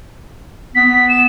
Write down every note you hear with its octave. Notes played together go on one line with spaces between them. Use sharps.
B3 B6
E7